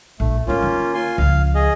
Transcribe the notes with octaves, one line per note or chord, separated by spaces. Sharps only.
A#1 A3
G#3 A#3 C#4 E4 F4
D#3
F4 G#5 C6
C#2 F3 F5
G#4 D#5